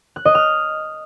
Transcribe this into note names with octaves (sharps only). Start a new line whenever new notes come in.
F#6
D#5
F6